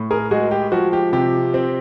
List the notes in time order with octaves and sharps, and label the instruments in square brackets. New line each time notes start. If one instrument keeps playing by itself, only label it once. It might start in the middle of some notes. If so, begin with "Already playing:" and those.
Already playing: [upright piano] A2
G#4 A#4
G#3 F#4 G#4
G4
F3 F#4
G4
C3 G4
C4